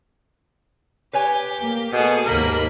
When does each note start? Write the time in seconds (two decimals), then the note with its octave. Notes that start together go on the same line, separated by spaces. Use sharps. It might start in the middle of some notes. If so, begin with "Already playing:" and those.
1.13 G4 B4 C#5 G#5
1.59 A#3
1.92 B2 G#4 A4
2.26 D#2 G#2 A#3 A#4 B5